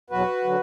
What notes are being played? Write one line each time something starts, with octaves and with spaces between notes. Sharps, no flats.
E2 B2 F#3 F#4 B4
D3 F#3